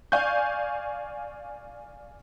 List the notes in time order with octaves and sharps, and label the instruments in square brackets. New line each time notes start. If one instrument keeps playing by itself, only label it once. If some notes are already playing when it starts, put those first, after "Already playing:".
[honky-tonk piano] D5 F5 G#5 C#6 G6